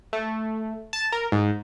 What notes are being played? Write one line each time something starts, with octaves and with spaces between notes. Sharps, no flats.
A3
A5
A#4
G#2